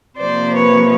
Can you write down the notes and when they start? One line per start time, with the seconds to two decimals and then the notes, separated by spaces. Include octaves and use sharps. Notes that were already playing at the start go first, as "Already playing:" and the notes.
0.18 C3 F3 A#3 C5 D5
0.56 B4 C#5